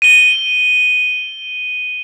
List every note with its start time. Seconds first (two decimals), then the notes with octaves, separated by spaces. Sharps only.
0.02 D#7 G7